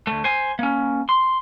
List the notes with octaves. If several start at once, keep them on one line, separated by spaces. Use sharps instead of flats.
D2 A3
C5 G#5
A#3 C#4
C6